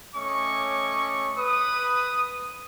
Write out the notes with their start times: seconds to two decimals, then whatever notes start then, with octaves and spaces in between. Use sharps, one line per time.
0.16 A3 C#4 C#5 D#5 C#6 D6
1.38 B4 D#6